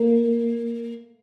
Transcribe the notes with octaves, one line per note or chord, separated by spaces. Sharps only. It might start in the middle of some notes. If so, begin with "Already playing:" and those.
Already playing: A#3